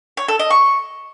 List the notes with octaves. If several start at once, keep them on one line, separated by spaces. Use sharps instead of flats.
C#5
A4
D#5
C#6